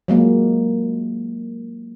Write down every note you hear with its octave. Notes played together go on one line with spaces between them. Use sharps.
F#3 G#3 A#3